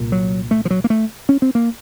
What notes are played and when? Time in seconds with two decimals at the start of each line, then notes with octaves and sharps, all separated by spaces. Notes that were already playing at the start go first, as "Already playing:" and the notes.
Already playing: C2 A#2
0.12 F#3
0.51 A3
0.65 F3
0.70 F#3
0.84 A#3
0.90 A3
1.29 C#4
1.42 C4
1.55 A#3